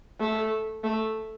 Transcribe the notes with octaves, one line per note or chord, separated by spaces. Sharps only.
A3
A3